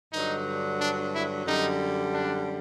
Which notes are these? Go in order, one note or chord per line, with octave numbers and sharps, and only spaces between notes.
G2 D3 F#3 D#4
D4
E4
F#2 D3 G3 D#4
D4